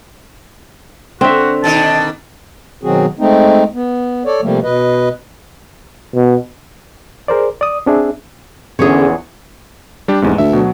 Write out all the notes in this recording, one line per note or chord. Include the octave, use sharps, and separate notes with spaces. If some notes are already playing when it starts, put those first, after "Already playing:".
D3 C4 F#4 E5
B2 D#3 D4 A5
B2 D#3 F#3 C4 F#4 G#4
G#3 A3 C4 D#4
B3
A4 C#5 D5
C3 F3 G3 A3 A#3
B2 B4 D#5
B2
G#4 A#4 C5 D5
D5 D#6
C4 D4 G#4 E5
A#1 E2 D3 C#4 G#4 C#5
G3 D4 G4
F1 E2 G#2
D2 E5
B2 F#3